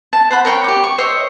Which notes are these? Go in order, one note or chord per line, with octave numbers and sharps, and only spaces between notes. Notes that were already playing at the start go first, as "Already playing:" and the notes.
A5
C5 F#5 B5
A#4 C#5 G5 B5
G4 D6
C#6
C5 C#5 D#5 E5